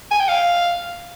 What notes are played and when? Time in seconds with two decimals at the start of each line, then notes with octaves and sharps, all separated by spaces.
0.11 G#5
0.20 G5
0.28 F5